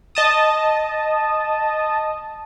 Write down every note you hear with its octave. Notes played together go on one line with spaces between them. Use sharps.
D#5 A5 D#6